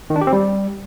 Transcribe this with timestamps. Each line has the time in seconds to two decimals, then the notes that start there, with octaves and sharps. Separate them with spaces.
0.10 D#3
0.16 D4
0.21 G4
0.27 C4
0.33 G3